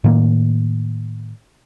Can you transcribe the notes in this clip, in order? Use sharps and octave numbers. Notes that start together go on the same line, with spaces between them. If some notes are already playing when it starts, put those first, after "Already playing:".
A2 D#3 A#3